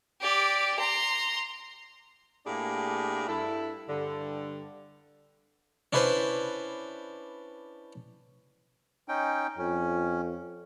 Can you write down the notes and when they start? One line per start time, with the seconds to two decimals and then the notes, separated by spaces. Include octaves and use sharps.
0.21 G4 D5
0.79 A#5 C6
2.46 A2 A#3 D4 E4 G4 G#4
3.27 G2 E4 A4
3.88 G2 D3
5.93 C#4 D4 E4 B4 C5
9.08 C#4 D#4 G5
9.58 F2 C#4